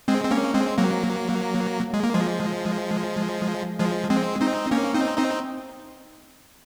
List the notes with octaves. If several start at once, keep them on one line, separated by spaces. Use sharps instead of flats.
G#3 C4
C4
A#3 C#4
G#3 C4
F#3 A#3
G#3
A#3
F3 G#3
F3 G#3
G#3 C4
C4 D#4
A#3 C#4
C4 D#4
C4 D#4